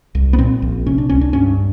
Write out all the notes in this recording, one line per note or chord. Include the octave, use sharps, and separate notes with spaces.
C2
B3
A#2 C4
A#1
C3 C#4
D4
C#2 C#4
D4
G2 C#4